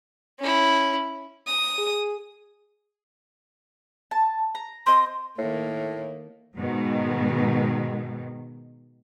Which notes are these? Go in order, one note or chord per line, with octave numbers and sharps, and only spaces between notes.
C#4 E4
D#6
G#4
A5
A#5
C4 D#5 C6
A2 D#3 A#3
G#2 B2 D#3